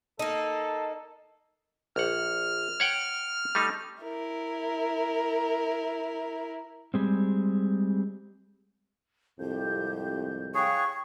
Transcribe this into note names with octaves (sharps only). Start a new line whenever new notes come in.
A#3 D#4 A4
A#1 F#5 F6
C#5 F#5 G5
G3 A3 D#4
E4 A#4
G3 G#3 C4
C2 F2 G#2 G4 G6
G#4 C#5 F5 G5 C#6 F#6